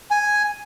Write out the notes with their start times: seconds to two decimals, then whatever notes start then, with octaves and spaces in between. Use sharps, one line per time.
0.11 G#5